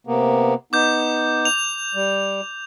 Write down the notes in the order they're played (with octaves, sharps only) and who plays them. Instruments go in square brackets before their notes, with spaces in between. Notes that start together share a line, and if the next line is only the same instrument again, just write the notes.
[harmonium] C3 A#3 B3
[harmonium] B3 D#4 [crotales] D6 G6
[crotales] F7
[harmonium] G3